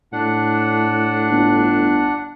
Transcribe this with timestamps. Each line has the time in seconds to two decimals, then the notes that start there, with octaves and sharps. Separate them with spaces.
0.13 A2 D4 F#5
1.30 G1